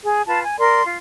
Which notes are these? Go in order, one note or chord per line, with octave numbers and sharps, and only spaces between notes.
G#4
F4 B4 A5
G#5
A#4 D5 C6
F4